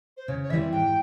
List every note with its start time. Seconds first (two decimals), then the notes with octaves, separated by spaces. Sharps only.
0.17 C5
0.28 C#3 C#5
0.43 C#5
0.50 E3 G3 C4 E5
0.72 G#2 G5